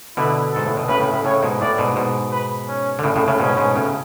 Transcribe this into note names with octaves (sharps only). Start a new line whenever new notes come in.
B2 D3 E4
G#2 A4
A2
B2
A2 C#3 B4
A2 C#3
A2 C#3
A2 C#3 C#5
G#2 B2
A2 D5
G#2 B2
G#2 B2
B4
C#4
D3
A2 C#3
A2 C#3
A2 C#3
G#2 B2 C#4
G#2 B2
A2 C#3